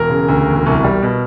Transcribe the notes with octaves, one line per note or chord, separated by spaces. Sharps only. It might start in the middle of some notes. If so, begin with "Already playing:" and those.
Already playing: E1 A#4
C#3
D2
E1
C2
G3
B2